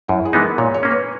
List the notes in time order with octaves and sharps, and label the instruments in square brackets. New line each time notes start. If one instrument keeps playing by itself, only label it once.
[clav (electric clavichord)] F#2 [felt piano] E4
[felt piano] G#4
[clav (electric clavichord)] E3 G#3 B3 D#4
[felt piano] A#4
[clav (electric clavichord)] A#2 [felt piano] C#5
[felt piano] C#5
[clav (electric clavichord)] A#3 C#4
[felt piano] B4